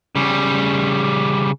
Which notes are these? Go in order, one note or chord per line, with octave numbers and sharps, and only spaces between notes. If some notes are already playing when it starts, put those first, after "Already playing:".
C#3 G3